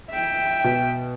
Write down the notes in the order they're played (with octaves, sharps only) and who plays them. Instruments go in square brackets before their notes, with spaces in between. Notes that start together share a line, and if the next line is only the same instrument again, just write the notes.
[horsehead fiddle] E5 G5
[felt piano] B2